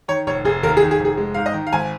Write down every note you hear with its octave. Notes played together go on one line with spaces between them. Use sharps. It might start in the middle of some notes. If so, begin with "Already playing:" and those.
D#3 C#5
F1 C#5
F1 G#4
D#2 A#4
G#4
D#3
G#4
F1
G#4
G#3
G#2 F5
D#5
D#3
F5
G#1 G#5